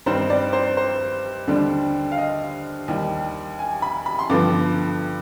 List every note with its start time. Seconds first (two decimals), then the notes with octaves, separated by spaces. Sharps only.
0.06 G2 D#3 G3 C4 C5
0.30 D5
0.53 C5
0.77 C5
1.48 D#2 D3 G3 D4
2.12 F5
2.18 D#5
2.88 D#2 D#3 G3
3.59 G#5
3.82 B5
4.06 B5
4.19 C6
4.29 G2 D3 F3 B3 D6